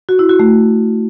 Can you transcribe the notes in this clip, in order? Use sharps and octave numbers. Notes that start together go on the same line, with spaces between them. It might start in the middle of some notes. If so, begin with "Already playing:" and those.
F#4
E4
F#4
A3